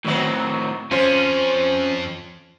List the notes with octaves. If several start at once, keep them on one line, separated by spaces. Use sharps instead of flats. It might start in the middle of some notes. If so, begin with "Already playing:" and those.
A2 D#3 F#3 B3 C4
F2 C#4 F4 C5